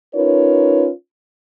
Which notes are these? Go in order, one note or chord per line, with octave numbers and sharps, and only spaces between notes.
C#4 D#4 F4 A#4 B4 C#5